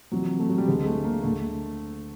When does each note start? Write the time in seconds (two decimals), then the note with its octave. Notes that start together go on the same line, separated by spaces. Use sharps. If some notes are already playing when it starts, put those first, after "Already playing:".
0.12 F2 C3 E3 F#3
0.39 A3
0.49 F#3
0.58 G3
0.68 D2 D3 G#3
0.80 G#3
0.86 A3
1.05 A#3
1.23 D2 D3 A3